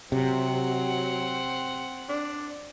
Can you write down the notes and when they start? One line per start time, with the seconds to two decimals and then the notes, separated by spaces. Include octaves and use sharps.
0.12 C3 F#3 C4 F#5
2.09 D4